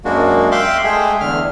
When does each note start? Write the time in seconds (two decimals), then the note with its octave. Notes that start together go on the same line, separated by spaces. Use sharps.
0.05 F#2 G#3 A#3 D4 F#4
0.51 E5 F5 G5 C6 D6 F#6
0.84 G#3 A3 G#4 E5 G5
1.21 E2 D3 F6